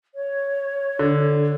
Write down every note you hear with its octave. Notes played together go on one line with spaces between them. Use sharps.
C#5
D3